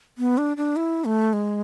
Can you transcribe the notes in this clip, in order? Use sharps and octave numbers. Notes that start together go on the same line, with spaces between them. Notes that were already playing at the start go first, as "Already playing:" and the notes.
B3
D4
D4
E4
A3
G#3